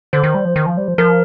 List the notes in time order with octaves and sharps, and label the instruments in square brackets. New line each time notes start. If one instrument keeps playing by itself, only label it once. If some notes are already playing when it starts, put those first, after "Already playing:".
[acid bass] D3 [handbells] C5
[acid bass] D#3
G3
F3
D#3
F3
G3
F3
[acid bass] F3 [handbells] A#4